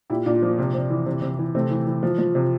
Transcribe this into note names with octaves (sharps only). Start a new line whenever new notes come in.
A#2 E4 G4
A#2 D4 F4
F3 A#3 D4
C3
C3
E3
C3
C3
E3
C3 A3 C4
E3
E3
F3
F3
C3